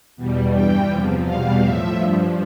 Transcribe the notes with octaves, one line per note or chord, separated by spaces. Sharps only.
E2 B2 G3
G2 E3 G3 G5
E2 C3 F3
E2 B2 G3 F5
A2 F3 E5
G2 F3